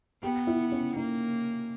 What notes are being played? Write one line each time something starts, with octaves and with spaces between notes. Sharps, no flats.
B3 G4
E4
C#4
A#3 D#4